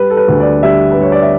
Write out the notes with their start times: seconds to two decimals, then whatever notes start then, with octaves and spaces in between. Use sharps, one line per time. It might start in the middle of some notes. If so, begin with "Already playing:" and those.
Already playing: G3 B4
0.10 A4
0.17 B4
0.28 D2
0.40 D5
0.63 G3 E5
0.91 B4
0.98 G3 C#5
1.12 D5
1.22 E5